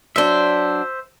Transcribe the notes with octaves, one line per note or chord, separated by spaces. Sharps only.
F#3 D4 C5 E5